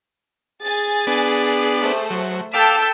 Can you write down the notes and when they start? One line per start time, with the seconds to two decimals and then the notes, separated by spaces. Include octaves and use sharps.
0.63 G#4 G#5 A6
1.07 B3 D4
1.81 A3 C5
2.10 F#3
2.53 A4 F5 G5 A5 D6 E6 B6